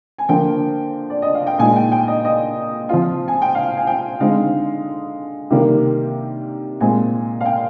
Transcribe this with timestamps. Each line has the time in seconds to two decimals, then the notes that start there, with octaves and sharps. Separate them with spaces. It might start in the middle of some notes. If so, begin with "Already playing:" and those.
0.18 G#5
0.28 D3 F3 A#3 G5
1.10 D5
1.22 D#5
1.35 F5
1.47 G5
1.59 A#2 G#3 D#4 G#5
1.76 G5
1.92 G5
2.08 D#5
2.25 D#5
2.89 F3 C4 F4
3.28 G#5
3.42 G5
3.55 F5
3.77 G#5
3.87 G5
4.20 D3 G#3 C4 D#4 F5
5.50 C3 D#3 G3 A#3
6.80 A#2 G#3 C4 G#5
7.41 F5
7.46 G5